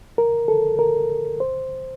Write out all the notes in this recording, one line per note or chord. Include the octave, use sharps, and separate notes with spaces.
A#4
A4
A#4
C5